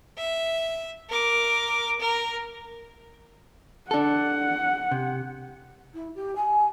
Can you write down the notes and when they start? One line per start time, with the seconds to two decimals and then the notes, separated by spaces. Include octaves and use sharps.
0.18 E5
1.09 A#4 D6
1.99 A#4
3.91 D4 A4 F#5
4.91 C3
5.94 E4
6.14 G4
6.35 G#5